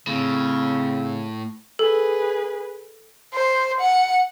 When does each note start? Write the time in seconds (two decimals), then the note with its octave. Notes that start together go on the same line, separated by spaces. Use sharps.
0.07 A2 C#3 C4
1.79 G#4 A4 B4
3.34 C5
3.80 F#5